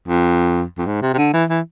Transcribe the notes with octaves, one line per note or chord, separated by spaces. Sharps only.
F2
F2
G#2
C3
C3
D3
E3
E3